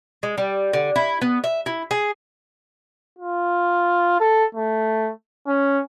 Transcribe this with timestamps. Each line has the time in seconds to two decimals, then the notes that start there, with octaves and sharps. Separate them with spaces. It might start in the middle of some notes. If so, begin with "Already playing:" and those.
0.23 G#3
0.38 G3
0.73 D3
0.96 E4
1.21 B3
1.44 E5
1.66 E4
1.91 G#4
3.19 F4
4.20 A4
4.55 A3
5.47 C#4